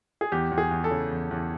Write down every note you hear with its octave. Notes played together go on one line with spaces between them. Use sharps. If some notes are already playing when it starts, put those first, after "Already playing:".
G#4
E2 G4
E2
G#4
E2
A4
C#3
E2
E2